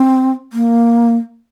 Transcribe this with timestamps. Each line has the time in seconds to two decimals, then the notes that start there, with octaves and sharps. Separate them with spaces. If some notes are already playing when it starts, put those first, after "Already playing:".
Already playing: C4
0.53 A#3